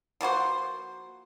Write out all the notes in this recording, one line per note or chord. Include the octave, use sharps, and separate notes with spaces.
F3 A#3 F#4 C5